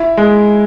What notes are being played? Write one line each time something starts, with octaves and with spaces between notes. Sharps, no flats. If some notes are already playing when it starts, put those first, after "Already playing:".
Already playing: E4
G#3